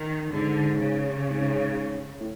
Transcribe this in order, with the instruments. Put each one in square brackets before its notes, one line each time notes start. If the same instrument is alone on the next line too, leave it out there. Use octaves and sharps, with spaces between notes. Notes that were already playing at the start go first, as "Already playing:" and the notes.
Already playing: [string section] D#3
[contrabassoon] G#2 [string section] D3
[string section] C#3
[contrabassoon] G#2
A2